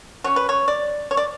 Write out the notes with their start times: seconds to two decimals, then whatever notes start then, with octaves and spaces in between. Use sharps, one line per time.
0.24 F#3 C#4 C#5
0.36 B4
0.49 C#5
0.68 D5
1.11 C#5
1.17 D5